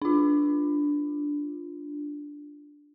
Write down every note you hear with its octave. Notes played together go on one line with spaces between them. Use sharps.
D4 F4